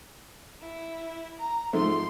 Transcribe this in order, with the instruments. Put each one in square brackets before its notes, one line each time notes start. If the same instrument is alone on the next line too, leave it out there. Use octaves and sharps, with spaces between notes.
[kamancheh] E4
A#5
[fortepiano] G#2 F3 A3 [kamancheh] C6